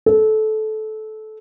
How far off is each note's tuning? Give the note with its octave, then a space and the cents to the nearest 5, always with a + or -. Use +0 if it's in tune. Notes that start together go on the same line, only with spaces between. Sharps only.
A4 -20